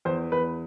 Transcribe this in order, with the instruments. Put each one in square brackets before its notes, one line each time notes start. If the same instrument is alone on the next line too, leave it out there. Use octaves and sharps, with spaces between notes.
[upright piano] E2 C5
E2 B4